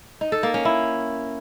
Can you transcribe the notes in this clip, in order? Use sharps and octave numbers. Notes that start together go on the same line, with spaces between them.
D#4
A4
A#3
C#4
E4